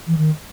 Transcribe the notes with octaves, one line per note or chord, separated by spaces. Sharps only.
E3
D#3